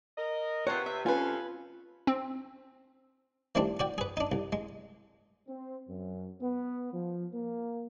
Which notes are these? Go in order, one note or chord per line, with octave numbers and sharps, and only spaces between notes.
A#4 D#5
C3 F4 B4 C#5 F#5
E5
F2 C3 C#4 F4 B4 G#5
C4
D#3 E3 G3 A3 C4 D4
F#4 D5 G5
G#4 B4
D4 D#4
C2
G#3
C4
F#2
B3
F3
A#3